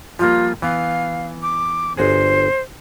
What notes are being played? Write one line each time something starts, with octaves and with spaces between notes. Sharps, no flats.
F3 G3 A#3 F4
E3 B3 F5
D6
G1 F#4 G#4 C5